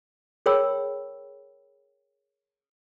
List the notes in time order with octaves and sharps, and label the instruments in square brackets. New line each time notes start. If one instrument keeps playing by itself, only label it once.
[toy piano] G#4 A#4 C#5 G5 B5 E6